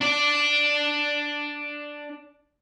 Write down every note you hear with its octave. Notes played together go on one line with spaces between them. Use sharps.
D4 D5